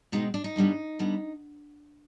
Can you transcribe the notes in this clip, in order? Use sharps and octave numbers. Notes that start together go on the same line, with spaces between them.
B2 G#3 C4 D#4
D4
D#4
G2 D3 G3 B3
D3 G3 B3